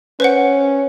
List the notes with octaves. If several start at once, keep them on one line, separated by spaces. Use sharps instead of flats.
C#4 B4 C5 F#5